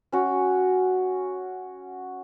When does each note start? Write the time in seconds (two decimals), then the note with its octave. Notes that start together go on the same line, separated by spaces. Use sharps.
0.12 C#4 F#4